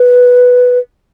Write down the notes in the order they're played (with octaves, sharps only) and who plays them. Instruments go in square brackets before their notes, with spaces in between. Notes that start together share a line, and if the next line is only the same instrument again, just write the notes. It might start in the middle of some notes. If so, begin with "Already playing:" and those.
Already playing: [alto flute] B4